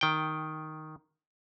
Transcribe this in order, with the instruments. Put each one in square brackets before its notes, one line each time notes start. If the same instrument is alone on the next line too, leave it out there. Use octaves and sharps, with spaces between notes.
[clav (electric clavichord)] D#3 G5